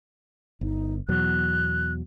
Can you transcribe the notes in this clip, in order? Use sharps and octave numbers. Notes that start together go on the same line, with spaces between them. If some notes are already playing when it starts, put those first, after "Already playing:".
G1 D#4
E2 B2 F#3 F#6